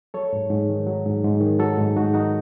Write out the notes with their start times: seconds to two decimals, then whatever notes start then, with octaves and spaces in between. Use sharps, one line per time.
0.14 F#3 A4 C#5
0.33 G#2
0.50 G#2
0.69 D#3
0.87 F#3
1.06 G#2
1.24 G#2
1.41 D#3
1.59 F#3 F#4 A4
1.78 G#2
1.96 G#2 D#4 F#4
2.14 D#3 D#4 F#4